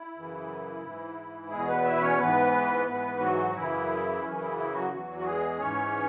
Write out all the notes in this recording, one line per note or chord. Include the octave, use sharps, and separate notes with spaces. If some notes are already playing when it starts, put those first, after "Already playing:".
Already playing: E4
F#2 C#3 E3
G#2 E3
E2 B2 G#3 G#4
B3 B4
E4 E5
B4
C#4 C#5
G#2 E3 B3 B4
G#2 E3 B3 B4
F#3 F#4
F#2 C#3 E3 E4
F#2 C#3 E3 C#4
E4
E4
F#3 F#4
E2 E3 F#3 F#4
F#4
G#3 G#4
G#2 E3 C#4 C#5